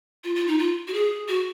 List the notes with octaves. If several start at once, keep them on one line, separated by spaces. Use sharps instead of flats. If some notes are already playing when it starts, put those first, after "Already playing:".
F4
F4
D#4
F4
F#4
G#4
F#4